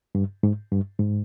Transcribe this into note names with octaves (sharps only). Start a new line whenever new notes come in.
G2
G#2
G2
G#2